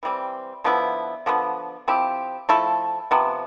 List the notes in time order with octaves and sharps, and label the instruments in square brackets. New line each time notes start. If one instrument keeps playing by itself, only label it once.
[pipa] E3 G3 C4
D3 F3 B3 E4
D3 F3 B3
F3 C4 E4 G4
F3 A3 E4 A4
C3 F3 B3